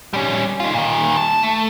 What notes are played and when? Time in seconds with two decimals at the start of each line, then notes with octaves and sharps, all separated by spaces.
0.13 G3 C#4
0.60 D#4 F4
0.74 A#2 D#3
1.17 A5
1.43 A3